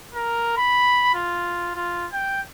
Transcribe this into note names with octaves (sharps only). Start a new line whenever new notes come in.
A#4
B5
F4
F4
G5